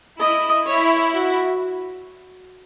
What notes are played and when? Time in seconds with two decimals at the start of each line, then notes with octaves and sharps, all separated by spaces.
0.19 E4 D#5
0.66 E4 C#5
1.13 F#4